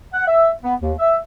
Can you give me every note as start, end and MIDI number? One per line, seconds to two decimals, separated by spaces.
0.14 0.26 78
0.27 0.50 76
0.63 0.74 59
0.81 0.92 39
0.99 1.17 76